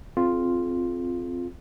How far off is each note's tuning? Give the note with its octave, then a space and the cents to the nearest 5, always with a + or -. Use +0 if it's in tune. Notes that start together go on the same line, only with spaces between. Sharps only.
C4 +0 F4 +0 G#4 +45